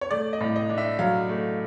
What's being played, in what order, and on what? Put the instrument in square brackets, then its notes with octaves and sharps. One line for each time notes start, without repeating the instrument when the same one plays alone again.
[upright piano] C#5
A3 D5
D#5
A2
D#5
D4
E5
F#3 F5
A3